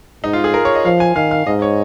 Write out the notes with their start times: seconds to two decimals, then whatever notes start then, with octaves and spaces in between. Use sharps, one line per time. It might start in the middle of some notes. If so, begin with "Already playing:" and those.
0.24 G#2 D#4
0.33 F4
0.44 G#4
0.54 A#4
0.65 C#5
0.75 D#5
0.85 F3 F5
1.00 G#5
1.16 D#3 F5
1.31 F5
1.46 G#2 D#5
1.62 C#5